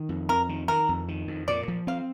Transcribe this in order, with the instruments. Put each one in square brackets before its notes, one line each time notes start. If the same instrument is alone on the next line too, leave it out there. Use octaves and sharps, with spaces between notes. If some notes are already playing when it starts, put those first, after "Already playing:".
Already playing: [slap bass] D#3
F2
[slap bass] F2 [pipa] A#4
[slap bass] D#3
[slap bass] D#3 [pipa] A#4
[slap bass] F2
D#3
F2
[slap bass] A#2 [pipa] D5
[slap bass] F3
[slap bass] C4 [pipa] F5